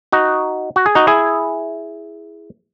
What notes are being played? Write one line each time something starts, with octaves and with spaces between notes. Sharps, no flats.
D#4 F#4
F#4
G#4
D#4 F#4
E4 G#4